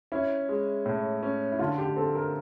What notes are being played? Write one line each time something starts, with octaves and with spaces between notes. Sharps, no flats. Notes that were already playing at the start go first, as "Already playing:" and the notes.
C#4 E4
G#3
A2
C#4
E4
D3 F4
G4
C4 A4
A#4